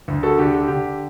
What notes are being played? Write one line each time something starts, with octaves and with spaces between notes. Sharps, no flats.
D2
F#4 A4
D3 G4
G4
D3 G4